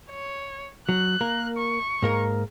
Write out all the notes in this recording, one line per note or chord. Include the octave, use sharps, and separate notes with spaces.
C#5
F#3 F#6
A#3 A#4
C#6
G#2 A#3 A#4